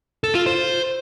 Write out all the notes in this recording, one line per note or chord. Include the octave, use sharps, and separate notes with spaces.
A4
F4
C5